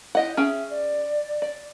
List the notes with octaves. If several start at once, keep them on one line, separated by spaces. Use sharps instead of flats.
E4 G4 D#5 F#5
C#4 G#4 E5 G5
D5
D5